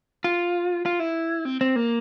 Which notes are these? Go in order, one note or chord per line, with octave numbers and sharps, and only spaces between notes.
F4
F4
E4
C4
C4
A#3